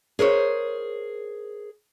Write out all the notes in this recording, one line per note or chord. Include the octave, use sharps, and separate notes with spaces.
G#4 A#4 C5 C#5